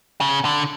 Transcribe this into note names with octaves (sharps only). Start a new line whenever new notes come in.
C#3
D3